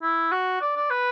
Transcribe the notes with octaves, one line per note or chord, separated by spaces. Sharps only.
E4
F#4
D5
D5
B4